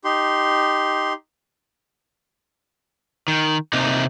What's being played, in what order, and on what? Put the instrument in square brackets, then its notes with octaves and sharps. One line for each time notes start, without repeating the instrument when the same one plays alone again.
[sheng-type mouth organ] D#4 G4 C6
[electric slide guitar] D#3
C3 A#3 D#4